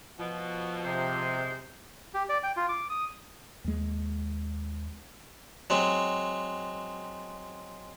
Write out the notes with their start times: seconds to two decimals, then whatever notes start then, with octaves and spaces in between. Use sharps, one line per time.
0.19 B2 F3
0.85 G#2 C3 G#3 C5
2.14 G4
2.29 D5
2.43 G5
2.57 F4
2.69 D6
2.90 D#6
3.64 D#2 G#3
5.70 F#3 G#3 C4